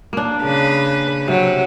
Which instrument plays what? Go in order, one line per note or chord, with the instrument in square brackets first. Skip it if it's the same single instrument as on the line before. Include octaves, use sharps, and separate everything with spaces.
[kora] A#3 D4
[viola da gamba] C#3 B4
[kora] C3 [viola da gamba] F#3